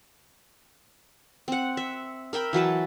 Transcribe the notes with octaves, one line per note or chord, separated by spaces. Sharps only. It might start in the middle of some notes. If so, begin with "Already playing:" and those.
C4 F#5
E5
A#4 E5 G5 B5
E3 F#3 B4 A5